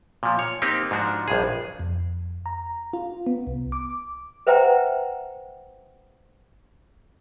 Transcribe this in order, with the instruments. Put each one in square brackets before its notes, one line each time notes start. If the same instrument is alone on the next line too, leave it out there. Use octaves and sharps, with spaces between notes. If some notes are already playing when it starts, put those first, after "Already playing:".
[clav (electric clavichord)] A#2 F3
C#5
A#3 C4 D#4 G4
G#2 F3 D4 F#4
A#1 G2 G#4
[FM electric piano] F2
A#5
F4
B3
C2
D6
[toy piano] B4 C5 E5 F#5 G5 A#5